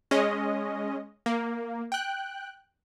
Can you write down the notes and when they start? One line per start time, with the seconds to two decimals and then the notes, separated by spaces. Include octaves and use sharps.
0.11 G#3 C#4 D#5
1.26 A#3
1.92 G5 F#6